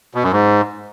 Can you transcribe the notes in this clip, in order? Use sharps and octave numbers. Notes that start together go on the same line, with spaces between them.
B2
F#2
G#2